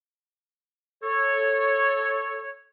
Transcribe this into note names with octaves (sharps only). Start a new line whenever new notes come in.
A4 C#5